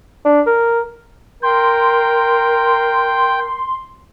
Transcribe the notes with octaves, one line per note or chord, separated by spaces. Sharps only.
D4
A#4
A#4 G5 C6